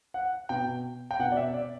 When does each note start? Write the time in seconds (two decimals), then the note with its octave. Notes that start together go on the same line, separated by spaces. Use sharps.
0.14 F#5
0.49 B2 G5
1.11 G5
1.19 B2 F#5
1.32 D5
1.37 E5
1.54 D5